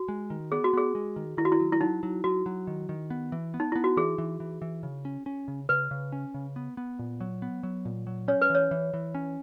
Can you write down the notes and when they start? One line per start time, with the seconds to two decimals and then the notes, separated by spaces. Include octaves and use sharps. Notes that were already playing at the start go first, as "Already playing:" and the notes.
Already playing: F#4
0.08 G#3
0.30 D#3
0.52 B3 G#4
0.64 F#4
0.73 B3 G#4
0.95 G#3
1.16 D#3
1.37 D#3 E4
1.45 F#4
1.52 E4
1.60 F#3
1.72 E4
1.81 F#3 D#4
2.03 F#3
2.24 F#3 F#4
2.46 F#3
2.67 D#3
2.89 D#3
3.10 B3
3.32 E3
3.54 B3
3.60 D#4
3.72 B3 E4
3.84 F#4
3.97 E3 G#4
4.18 E3
4.40 E3
4.62 E3
4.83 C#3
5.05 C#4
5.26 C#4
5.48 C#3
5.69 C#3 B4
5.91 C#3
6.12 C#4
6.34 C#3
6.56 B3
6.77 B3
6.99 A#2
7.21 F#3
7.42 B3
7.63 F#3
7.85 A#2
8.07 F#3
8.28 C#4 C#5
8.42 B4
8.50 E3 C#5
8.71 E3
8.94 E3
9.15 C#4